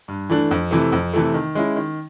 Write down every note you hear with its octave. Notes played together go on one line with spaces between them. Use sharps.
G2
E3 A3 D4
F2
C3 E3 A3
F2
C3 E3 A3
D#3
G#3 C#4 E4
D#3